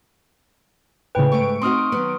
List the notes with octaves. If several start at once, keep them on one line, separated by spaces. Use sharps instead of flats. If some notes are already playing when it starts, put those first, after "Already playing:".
G#1 A2 C#3 B4 G5
G#2 A3 C#6 D7
C4 D#4 F#4 C6 D#6 F6
D#3 F#3 B3